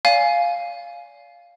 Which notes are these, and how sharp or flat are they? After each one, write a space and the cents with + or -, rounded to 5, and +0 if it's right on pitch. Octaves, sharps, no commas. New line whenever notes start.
D5 -35 F5 +0 G#5 +0